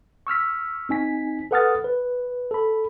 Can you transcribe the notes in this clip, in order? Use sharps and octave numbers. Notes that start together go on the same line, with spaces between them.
C#6 E6 F6 B6
C4 D#4 G#5 B6
A4 B4 F#5 D#6 F6 A6
B4
A4 B5